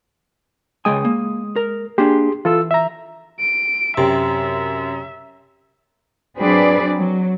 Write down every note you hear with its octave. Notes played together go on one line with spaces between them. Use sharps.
C#2 G#3 G5 G#5 D#6
A#3
A#4
A#3 D4 G4 G#4 C6
E3 F4 A4 E6
E5 A#5
D7
F#2 C3 E5
F#3 C4 D4 G#4 B4 D5
F#3